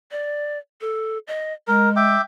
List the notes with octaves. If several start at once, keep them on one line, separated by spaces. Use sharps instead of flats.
D5
A4
D#5
G#3 A#4
E5 G5 D6